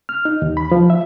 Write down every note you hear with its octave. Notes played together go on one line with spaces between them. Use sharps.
F6
D#4
D#2
B5
F3
E5